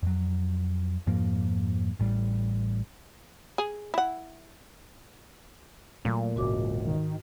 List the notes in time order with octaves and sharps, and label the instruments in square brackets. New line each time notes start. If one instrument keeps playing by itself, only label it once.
[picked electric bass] F2 F#3
F2 G#2 F3 A#3
A1 A2 G3
[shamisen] G#4
E4 F#5
[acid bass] A#2 [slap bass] F#3 A3 A#3
[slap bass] E1 C#2 [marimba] G#2 F#4 D6
[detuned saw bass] D#3